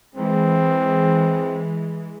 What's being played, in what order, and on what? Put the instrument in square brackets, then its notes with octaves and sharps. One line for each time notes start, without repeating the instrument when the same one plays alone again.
[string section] E3 G#3 [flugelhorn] C4